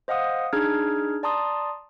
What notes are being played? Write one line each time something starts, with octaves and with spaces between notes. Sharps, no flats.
C5 D#5 F5 F#5 D#6
D4 D#4 G#4 F6 G#6
D5 A5 A#5 C6 D#6